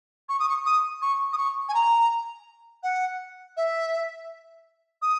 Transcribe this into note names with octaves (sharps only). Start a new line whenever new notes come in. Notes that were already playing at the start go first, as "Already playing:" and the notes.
C#6
D#6
C#6
D#6
C#6
D#6
C#6
G#5
A#5
F#5
E5
D#6